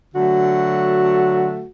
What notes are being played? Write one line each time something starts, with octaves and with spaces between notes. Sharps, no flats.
D3 F#3 A3 F#4